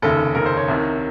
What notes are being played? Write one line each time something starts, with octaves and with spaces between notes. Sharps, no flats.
F1 D#2 C#3 A4
F1 D#2 C#3 A#4
C5
C#5
C2 C3 D#3